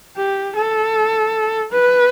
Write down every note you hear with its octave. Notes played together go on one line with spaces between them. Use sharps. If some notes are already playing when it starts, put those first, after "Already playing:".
G4
A4
B4